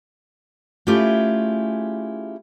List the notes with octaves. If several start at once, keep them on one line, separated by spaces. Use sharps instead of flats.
A3 C#4 E4 F4 G4 G#4